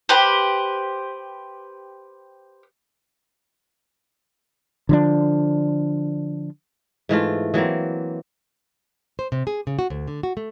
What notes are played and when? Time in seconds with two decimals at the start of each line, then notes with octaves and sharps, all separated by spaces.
0.09 G4 B4 C5
4.89 D3 F3 D4
7.09 G#2 E3 A3 F4
7.54 E3 F#3 A#3 C4
9.19 C5
9.32 C3
9.47 G#4
9.67 C#3
9.79 F#4
9.90 D2
10.08 D3
10.23 F#4
10.37 A3